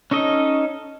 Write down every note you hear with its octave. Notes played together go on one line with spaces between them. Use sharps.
C#4 D#4 A4 D#5